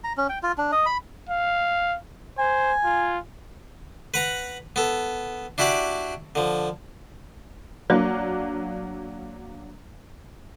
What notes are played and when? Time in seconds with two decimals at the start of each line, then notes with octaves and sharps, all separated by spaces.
0.04 A#5
0.17 C#4
0.29 G5
0.43 F4
0.58 D4
0.72 D#5
0.86 B5
1.29 F5
2.38 C5 G#5
2.84 F4
4.14 B4 F#5 A#5
4.76 B3 A4
5.58 D4 E4 F#4 G4 D5 D6
6.35 D3 F3
7.90 F#3 A#3 D4